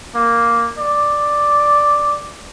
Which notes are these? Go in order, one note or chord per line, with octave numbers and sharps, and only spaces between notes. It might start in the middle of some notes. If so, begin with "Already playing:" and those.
A#3
D5